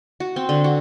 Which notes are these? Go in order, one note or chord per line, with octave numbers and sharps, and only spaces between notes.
F#4
C4
D3
F#4